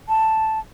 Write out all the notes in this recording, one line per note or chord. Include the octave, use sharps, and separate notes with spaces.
A5